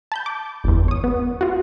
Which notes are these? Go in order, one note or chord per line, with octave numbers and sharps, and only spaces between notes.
A5 B5 G6
D6
G1 E2
C#5 D#6
B3
F4 F#4